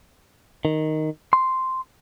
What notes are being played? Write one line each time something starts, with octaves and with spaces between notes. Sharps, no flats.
D#3
C6